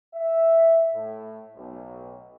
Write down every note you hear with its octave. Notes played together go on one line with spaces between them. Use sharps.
E5
A2
B1